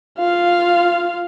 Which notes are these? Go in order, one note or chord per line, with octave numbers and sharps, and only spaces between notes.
F4 F5